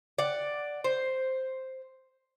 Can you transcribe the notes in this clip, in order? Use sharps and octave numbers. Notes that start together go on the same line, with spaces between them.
D5 F#5
C5